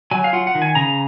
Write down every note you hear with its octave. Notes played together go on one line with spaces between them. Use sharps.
F#3 G#5
F5
F4 F#5
F#5
D#3
G#5
C#3 A#5